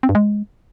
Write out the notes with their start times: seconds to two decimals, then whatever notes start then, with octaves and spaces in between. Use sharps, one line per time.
0.03 C4
0.09 G2
0.15 G#3